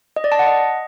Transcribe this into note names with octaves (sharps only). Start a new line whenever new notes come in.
D#5
D5
A5
F#5
D#5